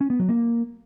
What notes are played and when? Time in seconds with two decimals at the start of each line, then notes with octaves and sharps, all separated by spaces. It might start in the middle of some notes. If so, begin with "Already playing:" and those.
0.01 C#4
0.10 B3
0.19 F#3
0.29 A#3